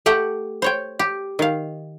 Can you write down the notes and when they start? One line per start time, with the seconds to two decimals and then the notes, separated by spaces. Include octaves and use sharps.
0.06 A3 G4 F#5 G5
0.62 C5 C#5 G5
0.99 G4
1.39 D#3 F5